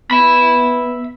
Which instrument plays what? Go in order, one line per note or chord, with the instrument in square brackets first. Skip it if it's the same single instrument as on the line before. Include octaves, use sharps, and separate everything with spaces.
[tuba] B3 [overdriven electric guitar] E5 B5